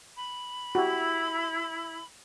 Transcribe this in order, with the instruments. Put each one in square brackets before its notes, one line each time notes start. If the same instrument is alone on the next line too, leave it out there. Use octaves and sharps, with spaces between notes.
[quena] B5
[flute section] E4 [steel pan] F#4 G4